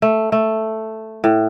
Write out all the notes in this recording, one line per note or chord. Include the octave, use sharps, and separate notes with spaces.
A3
A3
A2